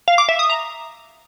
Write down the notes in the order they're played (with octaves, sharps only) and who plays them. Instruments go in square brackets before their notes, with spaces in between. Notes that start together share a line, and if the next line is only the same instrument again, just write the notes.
[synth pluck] F5
D6
E5
D#6
A#5